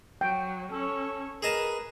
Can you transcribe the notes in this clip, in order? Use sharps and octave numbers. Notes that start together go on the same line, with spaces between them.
F#3 G5
C#4 A4 C#5
G#4 A#4 B4 D#5 A5